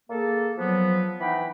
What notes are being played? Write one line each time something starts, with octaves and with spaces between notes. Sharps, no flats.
A#3 G#4 A4
F3 F#3 B3
E3 D#4 F#5 G5 B5